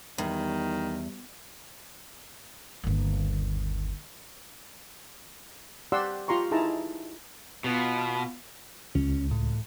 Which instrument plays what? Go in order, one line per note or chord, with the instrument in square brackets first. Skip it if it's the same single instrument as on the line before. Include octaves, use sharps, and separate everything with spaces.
[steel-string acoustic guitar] E2 [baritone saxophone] D#3 [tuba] G3
[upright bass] G1 D#2
[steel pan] G4 D5 F#5 C6 E6
F4 G4 A#5 C6 C#6
D#4 E4 G#4 A5 A#5
[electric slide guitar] B2 [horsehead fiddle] B3 F4
[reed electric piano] C#2 [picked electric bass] C#4
[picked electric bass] A2